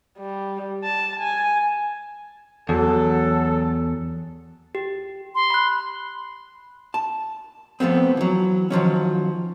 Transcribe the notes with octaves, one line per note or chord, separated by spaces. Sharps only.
G3
A5
G#5
E2 F#3 A4
G4
C6
B5 F#6
A5
F3 A3 B3 C4
E3 F#3
D#3 F3 F#3 C#4